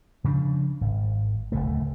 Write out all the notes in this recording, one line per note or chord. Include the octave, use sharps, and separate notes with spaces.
C#3 F3 B3 D4
G#1
D1 D#2 C#3 A3